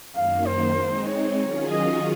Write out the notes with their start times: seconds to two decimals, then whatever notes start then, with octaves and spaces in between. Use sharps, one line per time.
0.16 F#2 D#3 A#3 F5
0.47 C5
0.78 G#3 C4 D#4
1.09 C#5
1.40 D#3 F#3 C#4 F4 G#4
1.71 D#5